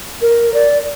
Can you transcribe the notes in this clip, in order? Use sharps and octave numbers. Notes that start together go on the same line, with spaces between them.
A#4
D5